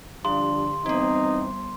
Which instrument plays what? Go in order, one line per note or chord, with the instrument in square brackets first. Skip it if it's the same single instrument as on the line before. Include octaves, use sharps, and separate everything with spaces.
[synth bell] D3 [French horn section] F3 G3 D4 [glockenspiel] C6
[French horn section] E3 C4 [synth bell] G3 B3 [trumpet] D#4